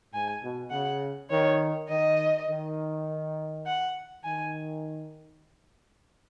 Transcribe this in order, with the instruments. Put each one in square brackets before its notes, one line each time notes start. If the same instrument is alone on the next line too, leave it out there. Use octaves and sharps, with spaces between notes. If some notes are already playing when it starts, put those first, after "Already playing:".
[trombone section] G#2 [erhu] G#5
[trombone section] B2
[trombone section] C#3 [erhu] F#5
[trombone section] D#3 [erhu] C#5
[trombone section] D#3 [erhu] D#5
[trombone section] D#3
[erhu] F#5
[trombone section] D#3 [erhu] G#5